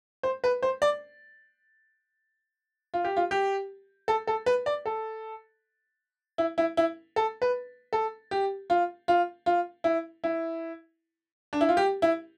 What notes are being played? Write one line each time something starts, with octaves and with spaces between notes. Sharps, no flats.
C5
B4
C5
D5
F4
G4
F4
G4
A4
A4
B4
D5
A4
E4
E4
E4
A4
B4
A4
G4
F4
F4
F4
E4
E4
D4
E4
F4
G4
E4